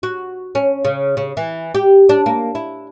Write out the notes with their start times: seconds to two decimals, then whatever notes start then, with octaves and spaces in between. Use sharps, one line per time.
0.03 F#4
0.55 C#4
0.85 C#3
1.17 C#3
1.37 E3
1.75 G4
2.09 D4
2.26 A#3
2.55 E4